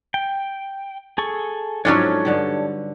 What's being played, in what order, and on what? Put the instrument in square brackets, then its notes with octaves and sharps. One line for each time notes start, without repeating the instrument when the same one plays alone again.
[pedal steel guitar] G5
G#4 A4 C#6
[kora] G#2 F3 F4 [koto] F#3 C#4 D4 [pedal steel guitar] A4 C#5
[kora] G2 D3 G4